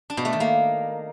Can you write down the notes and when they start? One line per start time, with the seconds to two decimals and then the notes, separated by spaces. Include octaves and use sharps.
0.10 D4
0.17 B2
0.25 A3
0.33 D#3
0.40 A#3